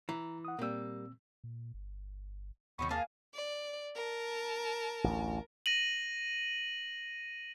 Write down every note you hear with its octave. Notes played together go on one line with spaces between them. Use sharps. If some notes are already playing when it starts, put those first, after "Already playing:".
E3 A#5
F#5 D#6
A#2 G3 A#3 C4 E6
A#2
G1
D#2 D#3 F#3 B3 C#6
A#3 G#4 F5 A5
D5
A#4 A5
A1 D2
A#6 D#7 F#7